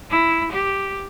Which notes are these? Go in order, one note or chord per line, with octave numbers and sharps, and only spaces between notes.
E4
G4